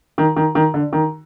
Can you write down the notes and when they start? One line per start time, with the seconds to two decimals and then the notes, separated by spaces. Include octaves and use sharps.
0.18 D#3
0.36 D#3
0.55 D#3
0.74 D3
0.93 D#3